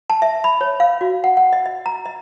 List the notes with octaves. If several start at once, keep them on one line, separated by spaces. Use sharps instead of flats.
A5
E5
B5
C#5
F5
F#4
F#5
F#5
D#5
D#5
A#5
D#5